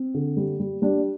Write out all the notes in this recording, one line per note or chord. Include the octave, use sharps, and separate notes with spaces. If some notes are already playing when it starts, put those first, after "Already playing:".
Already playing: C4
D3
G3
G3
G3 D4